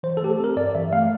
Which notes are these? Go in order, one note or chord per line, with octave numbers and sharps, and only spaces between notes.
E3 C5
A4
A3 G4
A4
C4 A#4
G2 D5
E3 E5
A3 F5